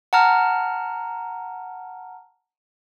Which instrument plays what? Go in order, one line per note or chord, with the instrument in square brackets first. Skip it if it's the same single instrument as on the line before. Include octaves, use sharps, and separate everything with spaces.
[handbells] F#5 A5 A#5 F6